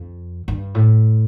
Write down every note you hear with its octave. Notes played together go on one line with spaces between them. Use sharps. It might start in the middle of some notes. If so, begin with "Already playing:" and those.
Already playing: F2
G2
A2